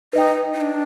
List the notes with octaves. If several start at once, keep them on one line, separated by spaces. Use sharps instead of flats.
D#4 B4 D#5 G5
D#4
D4